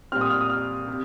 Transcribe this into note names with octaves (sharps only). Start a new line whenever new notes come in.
A#2 G3 C4 F6
D#6
F6
D#6
F6
C3